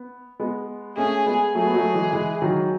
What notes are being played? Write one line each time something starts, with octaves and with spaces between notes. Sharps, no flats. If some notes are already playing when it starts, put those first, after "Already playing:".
Already playing: B3
G#3 B3
A3 C#4 G#4
G#3 B3
F#3 A3 G#4
B3
F#3 A3
E3 G#3
E3 G#3
D#3 F#3